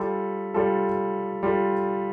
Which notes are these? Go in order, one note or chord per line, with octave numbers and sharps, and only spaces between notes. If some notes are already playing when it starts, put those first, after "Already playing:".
Already playing: G3 F4 A4
G3 F4 A4
G3 F4 A4